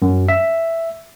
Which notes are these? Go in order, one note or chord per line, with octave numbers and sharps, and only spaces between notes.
F#2
E5